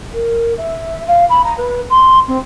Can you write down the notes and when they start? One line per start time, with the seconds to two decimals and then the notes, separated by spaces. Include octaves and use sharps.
0.13 A#4
0.57 E5
1.07 F5
1.29 B5
1.44 A#5
1.57 B4
1.90 C6
2.27 C4